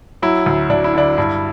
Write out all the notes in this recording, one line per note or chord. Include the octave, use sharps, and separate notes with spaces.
F#3 E4
D2
D2 D4
E4
D3 D4
G2 E4